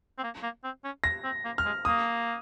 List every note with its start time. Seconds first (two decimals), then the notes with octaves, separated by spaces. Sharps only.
0.18 C4
0.23 A#3
0.43 A#3
0.64 C4
0.84 C#4
1.04 A#6
1.24 C4
1.45 A#3
1.58 F6
1.65 G#3
1.85 A#3 D#6